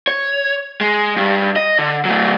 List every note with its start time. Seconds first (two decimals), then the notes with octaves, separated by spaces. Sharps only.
0.07 C#5
0.81 G#3
1.16 G2
1.56 D#5
1.79 D3
2.05 F#3 A3